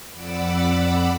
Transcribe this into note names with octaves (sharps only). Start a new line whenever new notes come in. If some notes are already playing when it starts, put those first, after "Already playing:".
F2 D5 F#5 B5 D6 E6